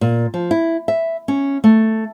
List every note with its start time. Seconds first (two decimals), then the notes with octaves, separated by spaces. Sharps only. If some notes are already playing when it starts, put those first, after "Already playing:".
0.01 A#2
0.34 F3
0.51 E4
0.88 E5
1.28 C#4
1.64 A3